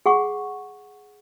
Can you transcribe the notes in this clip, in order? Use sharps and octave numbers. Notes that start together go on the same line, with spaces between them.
G#4 F#5 C#6